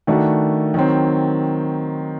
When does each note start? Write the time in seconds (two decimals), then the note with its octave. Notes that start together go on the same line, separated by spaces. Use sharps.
0.07 D#3 A3 D4 F#4
0.74 D#3 F#3 C4